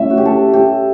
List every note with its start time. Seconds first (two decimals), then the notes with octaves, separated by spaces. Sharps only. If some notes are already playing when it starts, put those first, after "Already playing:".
Already playing: A2 C#4 E4 E5
0.10 F#4
0.17 G4
0.25 A4
0.54 G4